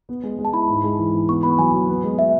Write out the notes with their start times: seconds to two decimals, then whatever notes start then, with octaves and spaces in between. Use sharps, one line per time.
0.09 B3
0.23 G#3
0.39 G#3
0.45 A5
0.53 E4 B5
0.69 G#2
0.83 G#3
0.99 E3
1.14 E3
1.28 B3 C#6
1.43 B3 B5
1.59 F#3 G#5
1.74 F#3
1.89 B3
2.04 G#3
2.18 G#3 E5